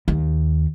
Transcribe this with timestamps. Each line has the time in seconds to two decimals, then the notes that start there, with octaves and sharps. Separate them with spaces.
0.08 D#2